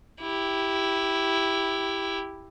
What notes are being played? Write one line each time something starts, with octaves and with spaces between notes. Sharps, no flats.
E4 G4